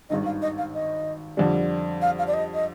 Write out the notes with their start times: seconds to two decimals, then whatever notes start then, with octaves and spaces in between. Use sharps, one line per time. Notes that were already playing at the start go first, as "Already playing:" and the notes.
0.09 G#1 G2 D#3 D#5
0.25 F5
0.41 D#5
0.57 F5
0.74 D#5
1.37 F2 D3 G3 D4
2.01 F5
2.18 F5
2.27 D5
2.33 D#5
2.53 D#5